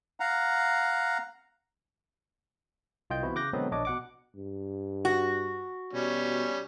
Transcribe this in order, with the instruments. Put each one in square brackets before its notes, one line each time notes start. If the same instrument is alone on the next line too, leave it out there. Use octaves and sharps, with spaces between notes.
[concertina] F5 F#5 A#5
[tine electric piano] C2 F4 D#5 G5 G6
E3 B3 C4 E4 F#4
C#3 D6 F#6 G6 A#6
B2 D3 F#3 G#3 B3 C4
A#1 D4 C#5 D#5 D6
B2 F#5 D6
[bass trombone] G2
[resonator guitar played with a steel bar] F#4
[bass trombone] B2 [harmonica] G3 C#4